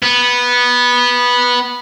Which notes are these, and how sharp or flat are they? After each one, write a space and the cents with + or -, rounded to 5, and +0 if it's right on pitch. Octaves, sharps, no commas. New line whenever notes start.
B3 -10